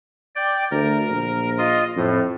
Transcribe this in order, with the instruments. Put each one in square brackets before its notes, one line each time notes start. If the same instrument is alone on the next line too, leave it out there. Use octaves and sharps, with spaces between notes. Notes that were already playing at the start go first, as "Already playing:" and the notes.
[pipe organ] D5 G5
[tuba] D2 [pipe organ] A#4
[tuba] A#1
[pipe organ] F4 D#5
[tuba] F2 [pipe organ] A2